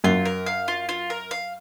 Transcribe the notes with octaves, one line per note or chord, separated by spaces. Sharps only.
F#2 F4
A#4
F5
F4
F4
A#4
F5